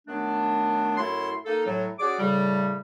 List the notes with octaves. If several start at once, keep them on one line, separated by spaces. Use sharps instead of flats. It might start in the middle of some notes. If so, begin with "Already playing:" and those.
D#3 F#3 A3 B3 D4
F#2 A3 E4 C#5 C6
A#3 D#4 A4
A2 F#3
C#4 F#4 G#4 D5 D6
A2 C#3 G3